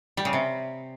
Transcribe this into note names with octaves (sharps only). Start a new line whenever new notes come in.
G3
C#3
C3